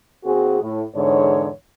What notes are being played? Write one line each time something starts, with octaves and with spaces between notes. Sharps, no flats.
D#2 C4 F#4 G#4
A2
E2 G#2 D3 C#5